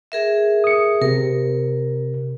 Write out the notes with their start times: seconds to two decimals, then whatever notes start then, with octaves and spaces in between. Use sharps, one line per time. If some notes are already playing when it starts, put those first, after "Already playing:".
0.12 G#4 A#4 E5
0.64 D#6 C#7
1.01 C3 A#4